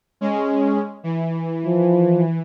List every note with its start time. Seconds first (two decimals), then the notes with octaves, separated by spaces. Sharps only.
0.21 G#3 C#4
1.03 E3
1.66 F3